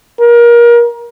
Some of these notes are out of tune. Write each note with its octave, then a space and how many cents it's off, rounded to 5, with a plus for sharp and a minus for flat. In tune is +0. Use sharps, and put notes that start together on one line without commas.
A#4 +25